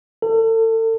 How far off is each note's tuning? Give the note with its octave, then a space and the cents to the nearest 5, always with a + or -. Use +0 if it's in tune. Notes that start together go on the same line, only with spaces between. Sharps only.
A4 +35